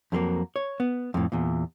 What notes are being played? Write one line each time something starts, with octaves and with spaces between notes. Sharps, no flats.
F2 F#3 G#3 A#3
C#5
B3
F2 A2
E2 A#2